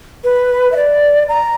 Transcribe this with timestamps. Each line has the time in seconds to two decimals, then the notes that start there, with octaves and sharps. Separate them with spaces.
0.24 B4
0.72 E5
0.76 D5
1.29 A#5